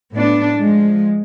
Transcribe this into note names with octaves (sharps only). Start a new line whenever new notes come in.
A2 B3 D4
F3 G#3